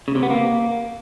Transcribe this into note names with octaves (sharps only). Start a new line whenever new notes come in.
C#3
C3
B3
A#3